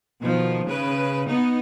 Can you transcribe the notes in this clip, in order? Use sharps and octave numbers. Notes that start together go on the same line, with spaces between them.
B2 D#3 F3
C#3 B4
B3 D#4